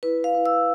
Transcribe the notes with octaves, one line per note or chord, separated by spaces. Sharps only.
E4 B4
F5
E4
E6